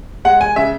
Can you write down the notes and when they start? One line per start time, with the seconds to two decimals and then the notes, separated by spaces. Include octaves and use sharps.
0.25 G#3 F#5
0.41 G#5
0.56 C#3 E5